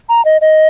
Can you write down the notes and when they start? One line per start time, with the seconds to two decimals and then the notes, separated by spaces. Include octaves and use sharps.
0.09 A#5
0.25 D#5
0.41 D#5